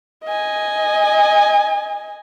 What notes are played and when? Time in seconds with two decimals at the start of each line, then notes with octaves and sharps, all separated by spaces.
0.24 D#5 G#5